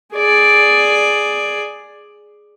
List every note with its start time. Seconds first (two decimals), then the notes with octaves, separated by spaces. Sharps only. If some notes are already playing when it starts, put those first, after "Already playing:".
0.14 G#4 D5